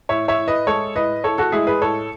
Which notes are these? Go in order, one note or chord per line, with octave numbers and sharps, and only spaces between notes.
A2 C#5 E5
C#5 E5
A2
B4 D#5
G#3 A4 C#5
A2 B4 D#5
A2 A4 C#5
F#4 A4
G#3 E4 G#4
G#4 B4
A2 A4 C#5